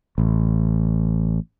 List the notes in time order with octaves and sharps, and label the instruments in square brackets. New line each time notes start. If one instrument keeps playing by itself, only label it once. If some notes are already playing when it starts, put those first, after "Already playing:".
[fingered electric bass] A1